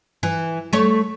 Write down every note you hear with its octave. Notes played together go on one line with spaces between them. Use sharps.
E3
A3 C#5